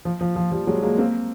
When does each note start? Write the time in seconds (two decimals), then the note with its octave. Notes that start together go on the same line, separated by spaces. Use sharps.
0.05 F3
0.21 F3
0.36 F3
0.51 F3 G3
0.67 F#3 G#3
0.83 G#3 A#3
0.98 A#3 C4